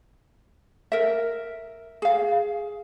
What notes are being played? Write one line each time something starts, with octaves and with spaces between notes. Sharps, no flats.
A#4 E5
G#4 F5